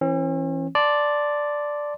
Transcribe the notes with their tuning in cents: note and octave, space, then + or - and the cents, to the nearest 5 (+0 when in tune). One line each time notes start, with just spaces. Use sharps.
E3 +0 C#4 -45
D5 +0 A5 +0 C6 +0